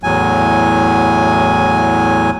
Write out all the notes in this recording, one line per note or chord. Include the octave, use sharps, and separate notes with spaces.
E2 A2 F#3 G#5